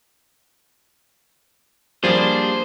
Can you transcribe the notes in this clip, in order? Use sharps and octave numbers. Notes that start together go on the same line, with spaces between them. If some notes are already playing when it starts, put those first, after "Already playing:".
F3 G3 A#3 D4 G#4 C5